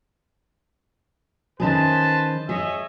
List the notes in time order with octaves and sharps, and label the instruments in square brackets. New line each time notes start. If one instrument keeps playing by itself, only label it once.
[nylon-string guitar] D#3 C#4 G#4 [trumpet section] B4 C5 A5
[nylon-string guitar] G#4 [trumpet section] C#5 D#5 E5